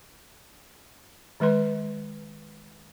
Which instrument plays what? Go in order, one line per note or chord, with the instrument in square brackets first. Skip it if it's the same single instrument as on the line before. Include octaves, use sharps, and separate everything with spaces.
[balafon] D#3 G#3 B4 C6